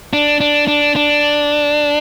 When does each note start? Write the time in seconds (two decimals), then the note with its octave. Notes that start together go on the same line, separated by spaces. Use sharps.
0.13 D4
0.40 D4
0.68 D4
0.96 D4